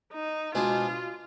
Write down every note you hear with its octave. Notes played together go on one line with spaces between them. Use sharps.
D#4
B2 G#3 D4 F4 G#4 C5